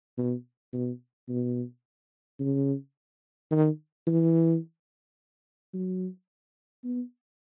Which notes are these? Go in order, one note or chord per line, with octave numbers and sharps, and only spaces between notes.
B2
B2
B2
C#3
D#3
E3
F#3
B3